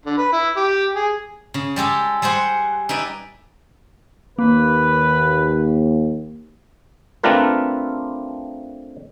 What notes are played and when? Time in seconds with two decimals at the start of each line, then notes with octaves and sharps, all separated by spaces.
0.06 D3
0.18 B4
0.33 E4
0.57 G4
0.95 G#4
1.54 C#3
1.76 G3 G#3 G4 A4
2.22 G3 G#4 C5 F#5
2.89 D#4 E4 B4 D5
4.39 D#2 A#3 B4
7.23 A3 C4 D4 F4 A#4 B4